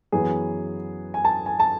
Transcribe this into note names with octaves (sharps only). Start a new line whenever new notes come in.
F#2 E3 B3 G#4
G#5
A5
G#5
A5